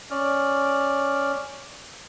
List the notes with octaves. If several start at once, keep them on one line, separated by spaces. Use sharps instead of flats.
C#4 D5 F6